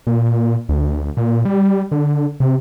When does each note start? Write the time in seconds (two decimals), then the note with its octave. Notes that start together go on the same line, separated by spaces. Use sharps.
0.07 A#2
0.69 D2
1.17 A#2
1.45 G3
1.92 D3
2.40 C3